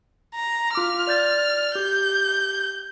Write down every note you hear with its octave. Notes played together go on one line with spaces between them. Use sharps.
A#5
F4 D6 F6
D5 G6 A6
G4 G6